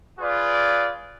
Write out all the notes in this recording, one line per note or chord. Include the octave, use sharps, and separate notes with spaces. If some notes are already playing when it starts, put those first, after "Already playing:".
F4 G#4 B4 D5